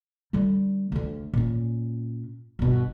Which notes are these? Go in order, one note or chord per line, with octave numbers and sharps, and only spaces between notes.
D3 G3
D2 D3
A#2 C#4
G1 B2